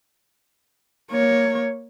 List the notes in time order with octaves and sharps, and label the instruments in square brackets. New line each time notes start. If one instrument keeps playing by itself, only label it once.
[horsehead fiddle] A#3 C#5